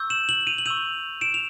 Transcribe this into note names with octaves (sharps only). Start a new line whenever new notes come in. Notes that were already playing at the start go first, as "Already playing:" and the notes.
Already playing: C#6 E6 G6
E7 F#7
E7 F#7
D#7 F7
F#7
C#6 E6 G6 D#7 F7
D7 E7
F7